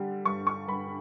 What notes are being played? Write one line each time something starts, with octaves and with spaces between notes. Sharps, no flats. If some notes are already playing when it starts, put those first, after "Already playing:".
Already playing: D3 G3
G2 C#6
C#6
G2 B5